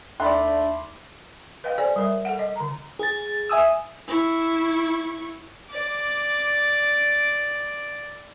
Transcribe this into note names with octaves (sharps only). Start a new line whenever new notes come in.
D#2 A3 D4 D5 B5 C6
B4 D#5 F5 G5
G#4 A4 C5 D5 G#5
G3 A#4 E5
A4 F#5
D#5
D3 A#5
G#4 A6
E5 G#5 D#6 E6
E4 C#6
D5 D6